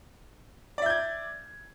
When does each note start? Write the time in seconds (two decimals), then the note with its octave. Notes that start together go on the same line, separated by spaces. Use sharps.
0.78 D5
0.82 E5
0.86 G6
0.90 G#6